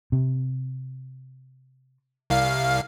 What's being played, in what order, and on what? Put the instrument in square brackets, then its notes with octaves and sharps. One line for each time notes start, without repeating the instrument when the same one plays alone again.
[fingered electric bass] C3
[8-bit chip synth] C2 F5